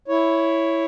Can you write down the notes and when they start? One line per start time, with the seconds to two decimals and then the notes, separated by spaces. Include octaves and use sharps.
0.08 E4 C#5